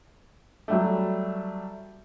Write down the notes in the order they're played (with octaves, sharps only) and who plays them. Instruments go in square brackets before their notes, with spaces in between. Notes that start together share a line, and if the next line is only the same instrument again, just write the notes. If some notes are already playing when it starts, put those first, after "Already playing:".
[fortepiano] F#3 G3 A3